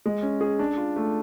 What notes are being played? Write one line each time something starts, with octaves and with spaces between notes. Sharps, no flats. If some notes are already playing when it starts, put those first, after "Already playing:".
G#3
C#4
G#4
D4
F4
A3